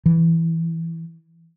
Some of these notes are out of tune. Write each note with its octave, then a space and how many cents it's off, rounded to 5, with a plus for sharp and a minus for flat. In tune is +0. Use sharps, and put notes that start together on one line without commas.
E3 +0